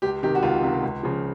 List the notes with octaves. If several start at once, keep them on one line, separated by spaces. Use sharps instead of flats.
C#2 G4
C3 D#3 G4
F#4
C#2 F4
C3 D#3
C#2
C#3 F3